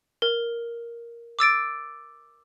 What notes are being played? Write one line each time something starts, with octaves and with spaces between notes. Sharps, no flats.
A#4
D6 E6 A6 D7